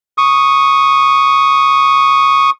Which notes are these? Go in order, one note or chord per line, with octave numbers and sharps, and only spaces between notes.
C#6 D#6